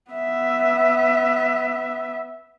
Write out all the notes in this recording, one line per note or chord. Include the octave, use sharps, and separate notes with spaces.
B3 E5